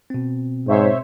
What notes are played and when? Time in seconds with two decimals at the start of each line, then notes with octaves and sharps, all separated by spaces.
0.10 B2 C4
0.68 G#2 C5 C#5 E5